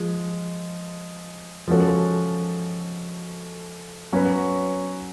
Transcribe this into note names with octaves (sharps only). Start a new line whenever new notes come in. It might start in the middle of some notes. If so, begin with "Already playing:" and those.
Already playing: F3 G#3
F3 G#3 C#4 F#4 A4
F#3 C#4 F#4 B4